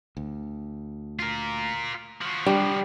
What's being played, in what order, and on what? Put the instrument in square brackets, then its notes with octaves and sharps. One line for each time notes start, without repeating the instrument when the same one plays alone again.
[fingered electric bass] D2
[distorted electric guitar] F4 A#4
F3 F#4
[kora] G3 [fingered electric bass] D4